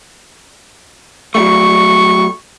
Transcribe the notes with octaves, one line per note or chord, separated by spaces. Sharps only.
F#3 G3 A3 C#6